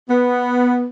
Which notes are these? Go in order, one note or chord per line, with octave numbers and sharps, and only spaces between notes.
B3